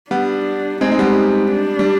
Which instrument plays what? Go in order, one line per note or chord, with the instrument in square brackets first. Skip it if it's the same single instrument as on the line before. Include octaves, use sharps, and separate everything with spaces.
[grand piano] G3 B3 [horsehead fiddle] D4
[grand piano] G#3 C4 [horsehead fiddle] D#4
[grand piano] G#3
G3 B3
[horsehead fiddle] D4
[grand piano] G3